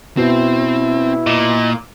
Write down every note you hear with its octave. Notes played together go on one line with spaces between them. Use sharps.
B2 C4 E4
A#2 D#5